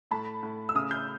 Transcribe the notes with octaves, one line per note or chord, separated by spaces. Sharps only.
A2 A5 B5
A2
E6
C#3 D#6 F6
F6 G6